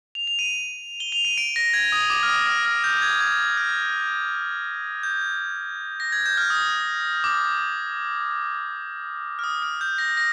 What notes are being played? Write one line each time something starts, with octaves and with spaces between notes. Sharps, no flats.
F7
F7
D#7
G7
F7
D#7
D7
A#6
G#6
D#6
D6
F6
D#6
F6
F6
G6
G#6
G#6
F6
G6
A#6
G#6
G6
F6
D#6
D6
F6
D#6
F6
G6
A#6
A#6